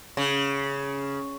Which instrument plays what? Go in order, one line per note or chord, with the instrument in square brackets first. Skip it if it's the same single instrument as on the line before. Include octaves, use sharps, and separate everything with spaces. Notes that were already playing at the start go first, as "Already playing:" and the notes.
[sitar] C#3